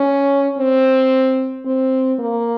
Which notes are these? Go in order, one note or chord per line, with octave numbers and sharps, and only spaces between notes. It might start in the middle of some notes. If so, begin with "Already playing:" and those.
Already playing: C#4
C4
C4
A#3